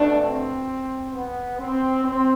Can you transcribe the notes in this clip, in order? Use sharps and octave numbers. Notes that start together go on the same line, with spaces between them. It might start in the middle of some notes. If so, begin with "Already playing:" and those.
Already playing: B2 A3 D4
C4
B3
C4
C4